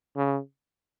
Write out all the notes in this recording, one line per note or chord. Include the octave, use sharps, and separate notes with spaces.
C#3